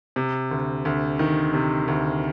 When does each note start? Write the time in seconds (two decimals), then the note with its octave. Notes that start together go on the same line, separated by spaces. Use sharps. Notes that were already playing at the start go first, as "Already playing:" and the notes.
0.16 C3
0.51 D2
0.85 D2
1.19 D#3
1.54 C3
1.88 D2